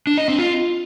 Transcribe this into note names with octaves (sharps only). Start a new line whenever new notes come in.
D4
D#5
C4
F4